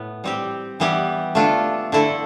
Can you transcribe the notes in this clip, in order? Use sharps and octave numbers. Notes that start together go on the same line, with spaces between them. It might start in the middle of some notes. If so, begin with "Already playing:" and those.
Already playing: A2 B3
G3 C4 G4
E3 G3 B3 E4 G4
D3 A3 D4 F4 A4
D3 A3 E4 A4